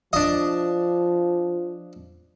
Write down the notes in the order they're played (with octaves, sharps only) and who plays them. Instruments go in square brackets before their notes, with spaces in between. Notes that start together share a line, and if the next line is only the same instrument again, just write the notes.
[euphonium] F3 [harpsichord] D4 D#5